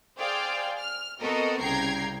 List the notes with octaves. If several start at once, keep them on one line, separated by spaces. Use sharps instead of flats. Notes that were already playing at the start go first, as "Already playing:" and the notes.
G#4 C5 D5 F5 G5
F6
B3 C4 F#4 A4 A#4 D#5
C2 C#3 G5 A#5 G#6 C7